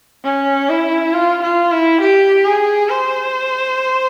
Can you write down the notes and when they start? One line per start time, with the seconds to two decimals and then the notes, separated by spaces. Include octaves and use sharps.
0.24 C#4
0.69 E4
1.13 F4
1.43 F4
1.72 E4
2.01 G4
2.45 G#4
2.89 C5